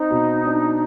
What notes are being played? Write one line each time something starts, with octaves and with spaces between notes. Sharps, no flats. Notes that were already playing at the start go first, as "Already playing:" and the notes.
Already playing: C4 D#4
B2
D4